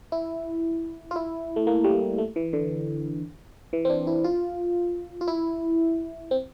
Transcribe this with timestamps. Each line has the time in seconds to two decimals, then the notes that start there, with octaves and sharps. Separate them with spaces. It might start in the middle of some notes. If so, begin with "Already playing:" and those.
0.12 E4
1.11 F4
1.16 E4
1.56 A3
1.67 A#3
1.84 G3
2.18 A3
2.36 E3
2.53 D3
3.73 E3
3.85 C4
3.90 D4
4.07 E4
4.24 F4
5.21 F4
5.27 E4
6.31 C4